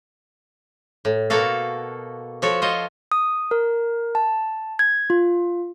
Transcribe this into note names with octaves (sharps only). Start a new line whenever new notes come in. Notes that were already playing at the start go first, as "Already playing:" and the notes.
A2
B2 A#3 F#4 A4 F5
F3 F#4 A4 C#5
F4 C5 C#5 D#5
D#6
A#4
A5
G#6
F4